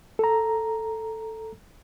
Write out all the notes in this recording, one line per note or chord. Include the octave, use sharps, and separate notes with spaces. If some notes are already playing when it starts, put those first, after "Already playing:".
A4 A#5